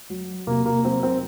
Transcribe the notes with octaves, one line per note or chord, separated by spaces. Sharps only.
F#3
C3 A#3
A#3
F#3 C4
C4